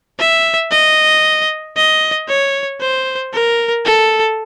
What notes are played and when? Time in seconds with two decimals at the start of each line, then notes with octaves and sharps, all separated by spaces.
0.19 E5
0.71 D#5
1.77 D#5
2.28 C#5
2.81 C5
3.33 A#4
3.85 A4